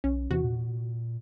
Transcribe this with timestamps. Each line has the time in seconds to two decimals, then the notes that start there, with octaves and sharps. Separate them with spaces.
0.04 B1 C#4
0.31 E2 C3 E3 F#4
0.44 A#2